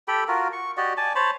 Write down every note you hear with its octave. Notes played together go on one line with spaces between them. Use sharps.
G4 A4 G5 B5
F4 F#4 A#4
C#6
F#4 G4 D5 D#5
D5 G#5 A5
C5 C#5 A5 B5